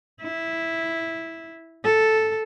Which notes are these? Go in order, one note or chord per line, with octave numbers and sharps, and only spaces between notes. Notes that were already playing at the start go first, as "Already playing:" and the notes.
E4
A4